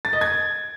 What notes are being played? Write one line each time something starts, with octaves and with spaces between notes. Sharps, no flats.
A6
D#5
G#6